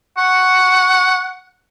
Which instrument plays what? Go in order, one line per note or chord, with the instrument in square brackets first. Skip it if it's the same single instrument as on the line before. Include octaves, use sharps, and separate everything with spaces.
[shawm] F#5 [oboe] C#6